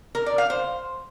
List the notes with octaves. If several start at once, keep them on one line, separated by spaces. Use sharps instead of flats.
A#4
D5
F5
C5